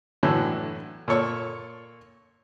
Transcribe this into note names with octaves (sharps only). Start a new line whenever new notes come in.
A2 D3 E3 F#3
A#2 A4 C#5 C#6